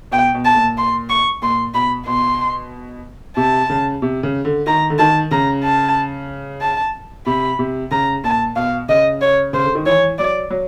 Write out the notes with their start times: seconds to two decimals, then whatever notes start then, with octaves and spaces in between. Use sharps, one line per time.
0.12 B2 G5
0.34 B2
0.45 A5
0.56 A#2
0.77 C6
1.10 C#6
1.42 A#2 C6
1.74 B2 B5
2.07 B2 C6
3.37 C3 A5
3.70 C#3
4.02 C3
4.23 C#3
4.45 D3
4.67 D#3 A#5
4.90 D3
4.99 D#3 A5
5.31 C#3 A#5
5.64 A5
6.61 A5
7.26 C3 B5
7.59 C3
7.91 C#3 A#5
8.24 A#2 A5
8.56 B2 F5
8.89 C#3 D#5
9.21 C#5
9.53 C#3 C5
9.64 D3
9.75 D#3
9.86 E3 C#5
10.18 F#3 D5
10.51 F#3